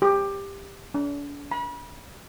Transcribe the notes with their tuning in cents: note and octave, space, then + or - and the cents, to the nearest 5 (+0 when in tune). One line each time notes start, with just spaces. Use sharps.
G4 +15
D4 -45
B5 -35